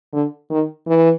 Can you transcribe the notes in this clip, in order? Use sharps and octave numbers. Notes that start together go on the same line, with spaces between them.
D3
D#3
E3